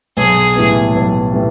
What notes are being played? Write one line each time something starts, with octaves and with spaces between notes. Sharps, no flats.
B1 G#4
A2 E3 G3 B3
B1
A2 E3 G3 B3